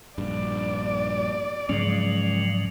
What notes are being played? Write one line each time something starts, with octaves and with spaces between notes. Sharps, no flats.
A#1 G2 D5
G#2 C#3 F3 F#3 G#3 C#4